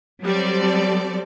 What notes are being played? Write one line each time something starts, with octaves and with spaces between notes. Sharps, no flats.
F#3 G3 C4 A4 D5